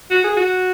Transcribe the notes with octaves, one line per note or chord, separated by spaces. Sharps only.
F#4
G#4
F#4